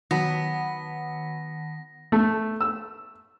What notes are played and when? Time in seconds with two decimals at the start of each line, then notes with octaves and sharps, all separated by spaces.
0.11 D#3 F#3 B3 A5 A#6 B6
2.12 A3
2.61 E6